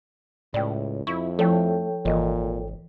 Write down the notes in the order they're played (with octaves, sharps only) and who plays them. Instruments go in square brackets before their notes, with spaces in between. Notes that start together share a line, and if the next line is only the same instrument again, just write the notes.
[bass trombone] C#2 [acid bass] A2 [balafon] D5 G5
[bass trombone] F2 [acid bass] E4 [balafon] C#6
[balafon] F3 E4 [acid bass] A3 [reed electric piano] A4 C#5 G5
[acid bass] G#1 [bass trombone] A#2 [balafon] E3 D#5